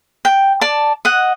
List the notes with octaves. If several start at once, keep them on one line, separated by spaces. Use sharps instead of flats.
G5
D5 A5
D#5 F#5